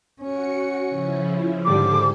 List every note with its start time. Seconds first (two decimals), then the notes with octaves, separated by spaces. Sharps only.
0.21 C#4 F#4 C#7
0.88 C#3 F3 E4
1.65 G#2 D3 G3 G#4 A4 C5 D6